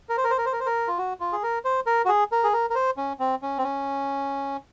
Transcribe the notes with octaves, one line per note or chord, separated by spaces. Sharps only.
A#4
C5
A#4
C5
A#4
C5
A#4
C5
A#4
F4
F#4
F4
G#4
A#4
C5
A#4
F#4
G#4
A#4
G#4
A#4
A#4
C5
C#4
C4
C#4
C4
C#4